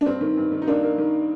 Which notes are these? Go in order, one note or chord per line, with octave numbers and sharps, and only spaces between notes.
D4
G2 C4
D#3
G2
D#3
D#4
A#3 D4
A#3
D#3